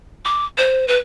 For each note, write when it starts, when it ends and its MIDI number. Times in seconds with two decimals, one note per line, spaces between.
0.25 0.45 86
0.58 0.87 72
0.88 0.97 71